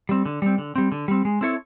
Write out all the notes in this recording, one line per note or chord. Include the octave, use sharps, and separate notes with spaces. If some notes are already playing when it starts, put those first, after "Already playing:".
G3 C4
D3
G3 C4
D3
G3 C4
D3
G3 C4
G#3
C4 E4 A4 C#5